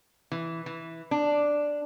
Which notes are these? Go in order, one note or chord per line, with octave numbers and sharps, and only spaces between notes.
E3
E3
D4